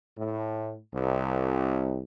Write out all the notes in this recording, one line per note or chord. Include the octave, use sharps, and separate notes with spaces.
A2
C2